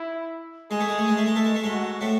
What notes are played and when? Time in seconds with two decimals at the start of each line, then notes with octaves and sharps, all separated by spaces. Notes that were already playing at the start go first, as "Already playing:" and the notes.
Already playing: E4
0.71 G#3 G#4
0.80 A3
0.89 G#3
0.98 A3
1.08 G#3
1.17 A3
1.26 G#3
1.36 A3 A4
1.45 G#3
1.55 A3
1.64 G#2 G#3 F#4
2.01 A2 A3